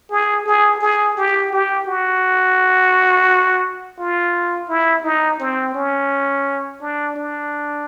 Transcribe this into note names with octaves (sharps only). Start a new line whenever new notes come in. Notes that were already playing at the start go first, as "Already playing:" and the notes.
G#4
G#4
G#4
G4
G4
F#4
F4
E4
D#4
C4
C#4
D4
D4